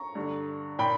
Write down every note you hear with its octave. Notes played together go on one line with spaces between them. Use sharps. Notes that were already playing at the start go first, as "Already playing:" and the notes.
Already playing: A#5 C#6
G2 D3
A#2 G5 B5